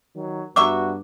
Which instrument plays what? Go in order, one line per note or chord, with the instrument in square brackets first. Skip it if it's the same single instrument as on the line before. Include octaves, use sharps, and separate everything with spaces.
[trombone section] D#3 F#3
[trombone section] G2 B3 F#4 [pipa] F#3 E5 C#6 [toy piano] D6